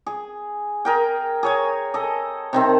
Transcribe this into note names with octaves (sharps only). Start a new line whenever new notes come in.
G#4
G#4 A#4 G5
G#4 C#5 G#5
A4 D#5
C3 D#3 C4